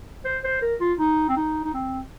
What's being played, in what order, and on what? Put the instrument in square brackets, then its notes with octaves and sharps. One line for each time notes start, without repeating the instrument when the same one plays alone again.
[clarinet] C5
C5
A#4
F4
D#4
C4
D#4
D#4
C4